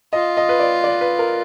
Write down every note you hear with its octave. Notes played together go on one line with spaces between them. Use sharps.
F4 D#5
D#5
B4
D5
D5
B4
A#4